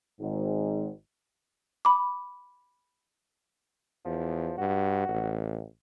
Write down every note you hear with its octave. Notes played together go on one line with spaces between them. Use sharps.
G#1 G#2
B5 D6
E2 F3
G2 F#4
A1